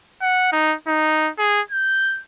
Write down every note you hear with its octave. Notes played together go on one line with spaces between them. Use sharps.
F#5
D#4
D#4
G#4
G6